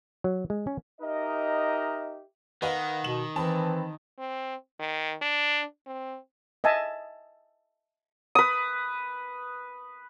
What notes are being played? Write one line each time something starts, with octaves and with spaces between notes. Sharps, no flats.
F#3
G#3
C#4
D#4 G4 A#4 D#5 E5
D#3 B4 D#5 F5 F#5
B2 E7 F#7
E3 C4 A5 B5
C4
D#3
D4
C4
D#5 E5 G#5 A5
B4 D#6